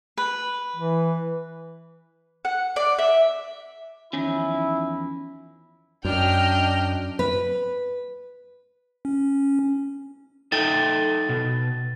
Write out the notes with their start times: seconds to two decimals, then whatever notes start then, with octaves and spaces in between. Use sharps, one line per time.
0.17 B4
0.76 E3
2.45 F#5
2.76 D5
2.98 E5
4.13 E2 D#3 F3 C#4 E4
6.05 F#2 D4 D#5 G5 F6
7.19 B4
9.05 C#4
10.52 D#4 A4 G5 A6
11.29 B2